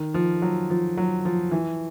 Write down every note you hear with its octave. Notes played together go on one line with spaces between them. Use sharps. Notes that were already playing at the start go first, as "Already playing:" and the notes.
Already playing: D#3
F3
F#3
F3
F#3
F3
E3